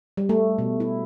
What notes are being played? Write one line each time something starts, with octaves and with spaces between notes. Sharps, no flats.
G3
A3
B2
E4